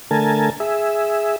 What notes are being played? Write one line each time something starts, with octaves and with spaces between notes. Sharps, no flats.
D3 A3 A#4 G#5 A5
G#4 E5